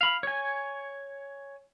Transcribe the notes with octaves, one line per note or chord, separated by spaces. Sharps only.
F5 B5
C#5 G#5